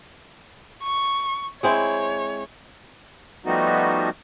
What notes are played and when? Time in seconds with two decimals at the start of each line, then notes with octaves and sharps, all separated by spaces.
0.84 C#6
1.63 G#3 C4 E4 C#5
3.46 F3 G3 A3 B3 D#4 F#4